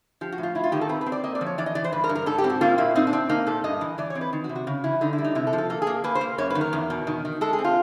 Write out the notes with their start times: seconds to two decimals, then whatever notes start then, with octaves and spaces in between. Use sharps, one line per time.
0.21 F3 G4
0.32 F#4
0.38 A2
0.43 F4
0.55 F#3 E4
0.64 F4
0.72 D#3 G4
0.81 A4
0.89 C4 B4
1.01 B4
1.06 C4
1.12 D5
1.24 A#3 D#5
1.35 D5
1.41 F3
1.46 C#5
1.58 E3 D5
1.66 D#5
1.75 E3 D5
1.84 C5
1.93 G2 B4
2.04 A#4
2.09 G2
2.15 A#4
2.26 G#2 A4
2.38 G4
2.44 C4
2.50 F#4
2.61 A#3 F4
2.78 A#2 E4
2.96 C4 D#4
3.07 D4
3.13 C4
3.29 A#3 D#4
3.47 A#2 A4
3.64 G2 D#5
3.81 E3
3.98 E3 D5
4.10 C#5
4.15 C4
4.21 B4
4.33 D#3
4.44 F#4
4.49 C3
4.56 F#4
4.67 C#3
4.84 E3 E4
5.01 D3 D#4
5.13 E4
5.18 G3
5.24 D#4
5.35 C3 E4
5.47 A4
5.53 F3
5.58 A4
5.70 A#3 A4
5.82 G#4
5.87 A#3
6.04 A#3 B4
6.15 C5
6.21 A#3
6.38 F#2 C#5
6.50 B4
6.55 D#3
6.61 A#4
6.73 E2
6.90 B2
7.07 D#3
7.25 D#3
7.41 G#3 A4
7.53 G#4
7.59 C4
7.64 F4